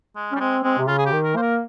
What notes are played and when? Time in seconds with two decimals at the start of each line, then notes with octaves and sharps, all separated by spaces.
0.16 G#3
0.32 C#4
0.36 G3
0.40 G#3 C4
0.64 G#3 C4
0.78 C3
0.88 C#3 F4
0.98 G#4
1.06 G4
1.12 D#3
1.24 A#4
1.36 A#3 C5
1.42 A#4